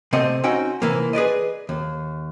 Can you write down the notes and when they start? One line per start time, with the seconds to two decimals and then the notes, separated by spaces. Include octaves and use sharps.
0.13 C3 A3 C4 D#5 F#5
0.44 C4 C#4 D#4 F#4 F#5 G5
0.82 C3 E3 A#3
1.13 G#4 B4 D5 D#5
1.69 D#2